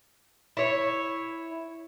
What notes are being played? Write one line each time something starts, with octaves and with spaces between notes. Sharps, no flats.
E4 C#5